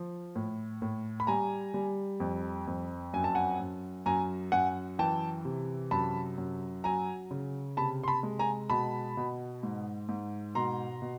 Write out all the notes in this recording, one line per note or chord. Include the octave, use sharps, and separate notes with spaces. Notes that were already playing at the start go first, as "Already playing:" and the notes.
Already playing: F3
A2
A2
B5
G3 G#5 A#5
G3
F2
F2
F#2 G#5
A5
F#5 G#5
F#2
F#2 G#5 A#5
F#2 F#5 G#5
E3 G5 A5
C3
F#2 A5 B5
F#2
F#3 G#5 A#5
C#3
C3 A5 B5
C6
A5 B5
G#3
G#5 A#5
B2 A5 B5
B2
G#2
G#2
B2 A#5 C6
B2